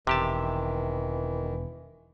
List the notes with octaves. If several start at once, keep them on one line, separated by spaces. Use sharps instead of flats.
E1 C3 D#3 E3 G4 A5